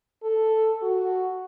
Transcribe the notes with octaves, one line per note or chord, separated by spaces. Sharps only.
A4
F#4